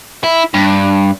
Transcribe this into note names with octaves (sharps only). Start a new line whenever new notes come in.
E4
G2